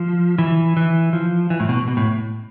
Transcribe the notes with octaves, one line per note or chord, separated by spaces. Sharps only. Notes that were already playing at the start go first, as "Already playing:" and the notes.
Already playing: F3
E3
E3
F3
E3
A2
B2
B2
A2